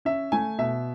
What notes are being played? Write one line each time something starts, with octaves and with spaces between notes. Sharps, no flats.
C#4 E5
A3 G#5
B2 E5